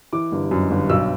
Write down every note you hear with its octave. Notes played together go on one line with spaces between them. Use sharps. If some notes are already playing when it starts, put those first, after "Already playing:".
E3 D6
G1
F#2
G1
B1 E6